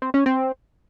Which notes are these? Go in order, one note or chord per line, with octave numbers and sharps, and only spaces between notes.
C4
C#4
C4